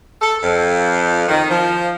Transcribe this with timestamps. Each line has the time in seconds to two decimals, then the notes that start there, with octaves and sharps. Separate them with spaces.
0.21 A4
0.43 F2
1.28 D#3
1.49 F3